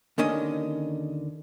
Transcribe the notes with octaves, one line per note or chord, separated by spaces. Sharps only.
D#2 D3 D#3 C#4 D#5